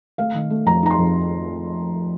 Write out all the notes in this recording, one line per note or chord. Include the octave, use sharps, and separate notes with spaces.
A3 F5
D#3
A3
F2 A#5
D#4 A#5
C6
F2